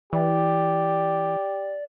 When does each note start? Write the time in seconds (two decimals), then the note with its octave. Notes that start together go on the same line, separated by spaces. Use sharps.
0.13 E3 G4 D5